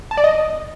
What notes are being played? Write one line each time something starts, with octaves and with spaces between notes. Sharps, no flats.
A5
D5
D#5